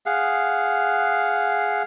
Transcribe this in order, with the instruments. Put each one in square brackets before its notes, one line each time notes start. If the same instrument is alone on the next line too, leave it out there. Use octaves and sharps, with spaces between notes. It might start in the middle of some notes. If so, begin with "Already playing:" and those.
[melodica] G#4 F5 F#5